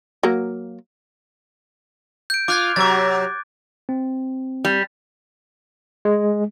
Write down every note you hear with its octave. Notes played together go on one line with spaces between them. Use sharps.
F#3 A#3
G6 D7
F4 D6 F#6 G#6
C3 F#3 D6 A6
C4
G3
G#3